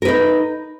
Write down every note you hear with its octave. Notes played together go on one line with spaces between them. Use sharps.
D#4 A#4 B4